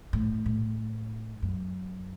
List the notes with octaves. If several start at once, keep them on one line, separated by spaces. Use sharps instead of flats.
A2
A2
F#2